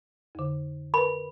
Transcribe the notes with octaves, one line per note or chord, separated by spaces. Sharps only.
F2 D3
A#4 B4 B5